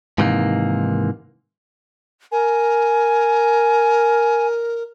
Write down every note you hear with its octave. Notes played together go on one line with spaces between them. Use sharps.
G#2 C3 D#3 E3 G3 A#3
A#4 G#5